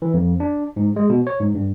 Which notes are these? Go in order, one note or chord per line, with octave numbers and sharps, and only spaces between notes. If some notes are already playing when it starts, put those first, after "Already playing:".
E3
F2
D4
G#2
G#3
B2
C#5
G#2
G2